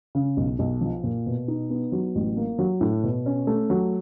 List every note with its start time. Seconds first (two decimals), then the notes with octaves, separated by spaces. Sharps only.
0.15 C#3
0.37 B1
0.59 B1
0.81 F3
1.04 A#2
1.26 B2
1.48 D#4
1.70 B3
1.92 F#3
2.15 A1
2.37 A#3
2.59 F#3
2.81 A2
3.03 B2
3.26 C#4
3.47 A3
3.70 F#3